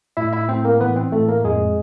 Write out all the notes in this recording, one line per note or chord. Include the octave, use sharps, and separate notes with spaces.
A2 E4 E5
E4 E5
A2 C4 C5
A#3 A#4
E3 B3 B4
C4 C5
A2 A3 A4
A#3 A#4
F2 G#3 G#4